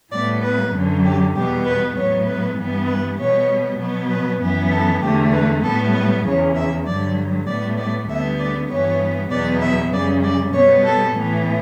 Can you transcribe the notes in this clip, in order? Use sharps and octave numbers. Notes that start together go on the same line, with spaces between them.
A2 G3 B3 D5
B4
F#2 D3 F#3
G4
E2 B2 G3 B3 G4
B4
A2 F#3 B3 C#5
B4
G2 E3 G3 B3
B4
B2 G3 B3 C#5
B2 F#3 B3
B4
F#2 E3 B3
A4
E2 D3 A3 G4
B4
A2 G3 B3 A4
B4
E2 C#3 E3 C#5
E5
G2 D3 F#3 D5
A2 G3 B3 D5
D5
D2 D3 G3 B3 E5
D5
G2 E3 B3 C#5
E2 B2 F#3 B3 D5
E5
F#2 C#3 G3 D5
D5
B2 G3 B3 C#5
A4
A2 E3 B3